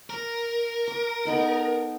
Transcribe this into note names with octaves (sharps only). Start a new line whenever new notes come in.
A#4
D6
B3 D#4 A4